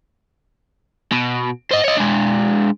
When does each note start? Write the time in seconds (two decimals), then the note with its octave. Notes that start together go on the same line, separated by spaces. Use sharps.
1.12 B2
1.71 C5 D#5
1.84 C#5 D#5
1.97 G#3 D4